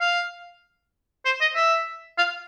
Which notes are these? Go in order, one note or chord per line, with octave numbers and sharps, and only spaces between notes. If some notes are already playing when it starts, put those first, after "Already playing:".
F5
C5
D#5
E5
F5